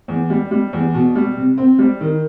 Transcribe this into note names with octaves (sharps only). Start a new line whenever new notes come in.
E2
G3
G3
E2
B2
G3
C3
C4
G3
D#3